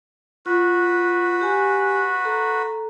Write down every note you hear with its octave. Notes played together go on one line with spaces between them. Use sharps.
F4 F#4 B4
G4 G#5
A4 A#5